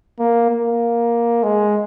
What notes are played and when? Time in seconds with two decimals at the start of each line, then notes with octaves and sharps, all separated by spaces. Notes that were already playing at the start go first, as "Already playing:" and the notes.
0.19 A#3
0.50 A#3
1.43 G#3